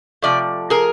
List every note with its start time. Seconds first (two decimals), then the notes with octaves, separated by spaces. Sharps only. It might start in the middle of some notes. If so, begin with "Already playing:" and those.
0.22 C3 F3 A3 D5
0.70 G#4 A#4